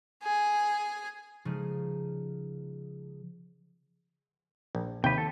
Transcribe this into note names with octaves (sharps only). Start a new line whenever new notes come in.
G#4 G#5
C#3 F3 G#3 D#4
A#1
D#2 C3 B4 G5
A4